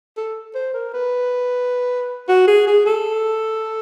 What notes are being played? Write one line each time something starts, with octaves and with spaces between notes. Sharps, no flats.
A4
C5
A#4
B4
F#4
G#4
G#4
A4